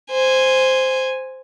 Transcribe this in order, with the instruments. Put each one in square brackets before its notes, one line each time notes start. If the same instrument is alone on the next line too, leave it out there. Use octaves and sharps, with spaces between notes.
[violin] C5 G#5